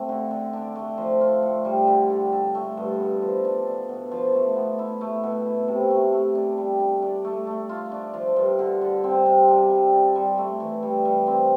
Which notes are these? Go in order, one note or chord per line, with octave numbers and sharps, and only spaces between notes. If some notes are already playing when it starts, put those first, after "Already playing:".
Already playing: A3 C4
D3
D3
D4
A3
F3
F4
A2
G3
D3
D3
A4
A3
G2
B3
F3
D4
D4
B2
F3
A3
B3
E4
A3
B2
E4
C3
A3
A3
D4
G3
D4
D4
A3
A3
F4
D4
F3
G2
D3
D3
C4
C3
D4
G3
D4
G3
A3
E3
G3
G3
C4